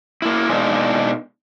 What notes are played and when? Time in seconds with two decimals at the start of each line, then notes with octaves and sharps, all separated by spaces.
0.22 A#3 E4
0.49 B2 G#3 A#3 D4 D#4